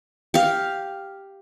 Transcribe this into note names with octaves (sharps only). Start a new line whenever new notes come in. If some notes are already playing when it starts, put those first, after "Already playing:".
G4 F5